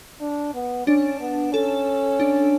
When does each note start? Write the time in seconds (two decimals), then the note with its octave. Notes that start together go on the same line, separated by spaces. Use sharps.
0.21 D4
0.55 B3
0.87 C#4 D4
1.21 B3
1.53 C#4 A4
2.20 D4